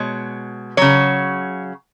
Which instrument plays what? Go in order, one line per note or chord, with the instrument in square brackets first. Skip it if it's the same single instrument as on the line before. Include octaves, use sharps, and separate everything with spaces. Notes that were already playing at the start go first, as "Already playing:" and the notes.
Already playing: [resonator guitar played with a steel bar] B2 G#3 C#5
C#3 F#3 C#5